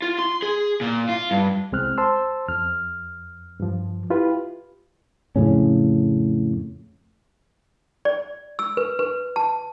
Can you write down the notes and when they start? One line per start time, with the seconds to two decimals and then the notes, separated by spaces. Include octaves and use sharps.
0.02 F4
0.19 C6
0.42 G#4
0.81 A#2
1.09 F4
1.31 G2
1.72 C2 G#3 C4 F6 F#6
1.98 C5 A5 C6 E6
2.48 F2 F6
3.60 G2 F3
4.10 E4 F4 G4 B4
5.36 F2 A2 C#3 C#4
8.05 D5
8.59 E6
8.77 B4
8.99 B4
9.36 A5